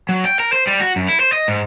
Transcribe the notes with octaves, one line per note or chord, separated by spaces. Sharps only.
F#3
G5
A#4
C5
G3
F#4
F#2
E4
C5
D#5
G#2